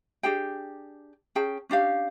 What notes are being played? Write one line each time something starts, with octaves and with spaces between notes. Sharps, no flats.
D4 G4 G#4 G5
C#4 G#4 G5 A5
C#4 D4 G4 F5